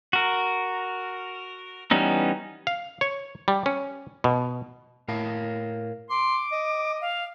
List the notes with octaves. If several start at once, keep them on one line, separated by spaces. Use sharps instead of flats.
F#4 A#4
E3 G3 B3 C#4 D#4
F5
C#5
G3
C#4
B2
A2 A#4 C#5 F5
C6 D6
D#5
F5